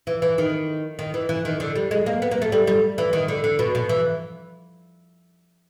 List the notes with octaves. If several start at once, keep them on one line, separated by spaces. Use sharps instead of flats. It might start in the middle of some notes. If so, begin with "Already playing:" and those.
E3
E3
D#3
D#3
E3
E3
D#3
D3
G3
G#3
A#3
B3
A#3
A3
G3
G3
E3
D#3
D3
D3
B2
B2
E3